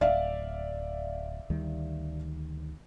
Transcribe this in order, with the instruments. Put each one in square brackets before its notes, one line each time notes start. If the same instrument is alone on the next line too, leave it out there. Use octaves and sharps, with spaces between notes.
[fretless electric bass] D1 [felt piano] D5 E5 F5
[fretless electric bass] D2 D#3 G3